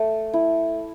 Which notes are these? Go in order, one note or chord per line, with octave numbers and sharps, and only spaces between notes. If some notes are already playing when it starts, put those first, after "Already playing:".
Already playing: A3
E4